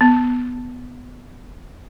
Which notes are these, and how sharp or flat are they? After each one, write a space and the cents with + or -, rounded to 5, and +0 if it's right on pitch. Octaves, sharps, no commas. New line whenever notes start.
B3 +5